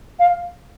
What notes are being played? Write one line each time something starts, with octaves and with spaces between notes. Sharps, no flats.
F5